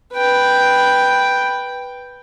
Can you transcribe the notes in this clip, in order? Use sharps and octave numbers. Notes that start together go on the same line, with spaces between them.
B4 G5